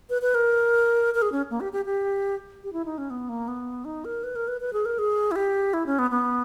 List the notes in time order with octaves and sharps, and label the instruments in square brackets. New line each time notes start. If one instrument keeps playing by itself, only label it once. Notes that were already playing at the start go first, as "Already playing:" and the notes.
[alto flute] B4
B4
A#4
A#4
G#4
C#4
A#3
G4
G4
G4
G4
E4
D#4
C#4
B3
A#3
B3
D#4
A#4
B4
A#4
B4
B4
G#4
A#4
G#4
E4
G4
E4
C#4
B3
B3